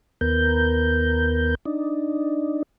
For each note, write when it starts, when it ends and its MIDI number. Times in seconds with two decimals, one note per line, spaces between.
0.21 1.55 39
0.21 1.55 59
0.21 1.55 70
0.21 1.55 91
1.66 2.63 62
1.66 2.63 63